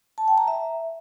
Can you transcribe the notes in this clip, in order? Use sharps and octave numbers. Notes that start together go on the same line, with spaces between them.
A5
G5
A#5
E5